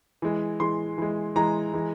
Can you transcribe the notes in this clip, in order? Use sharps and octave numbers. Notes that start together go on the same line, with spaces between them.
E3 G#3
E3 G#3 C6
E3 G#3
E3 G#3 A#5
E3 G#3